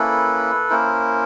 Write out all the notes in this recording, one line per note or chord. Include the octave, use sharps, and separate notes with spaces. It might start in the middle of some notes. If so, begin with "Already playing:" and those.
Already playing: A#3 C#4 E4 A4 B4
A#3 C#4 E4 A#4 C5